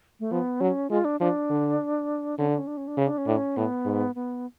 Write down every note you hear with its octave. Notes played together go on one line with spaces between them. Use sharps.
A3
F3 B3
F#3 C#4
G#3 F4
D4
F3 D4
D3
D3 C#4
D4
C#4
D4
C#4
D4
C#3 C#4
D4
C#4
A2 D4
C#4
A2 B3
G#2
B3